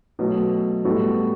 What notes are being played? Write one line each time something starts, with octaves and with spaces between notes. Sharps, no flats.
B2 F#3 A3
A2 G3 B3 F#4 A4